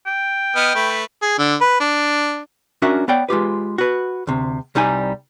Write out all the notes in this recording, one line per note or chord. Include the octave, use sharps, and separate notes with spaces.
G5
B3 D#5 F6
A3 B4
G#4
D3
B4
D4
C#4 D4 F#4 A#4 E5
B3 C#5 D5 G5
G#3 F4 G4 B4
F#4 B4
D2 C3
C2 G3 D#4 G4 G#5